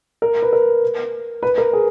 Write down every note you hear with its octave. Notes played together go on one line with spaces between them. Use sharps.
A#4
B4
A#4
B4
A#4
G#4